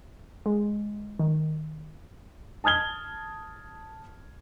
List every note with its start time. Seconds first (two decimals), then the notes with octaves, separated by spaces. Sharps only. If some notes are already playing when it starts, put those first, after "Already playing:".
0.46 G#3
1.19 D#3
2.64 A5 D#6 F6 G#6 G7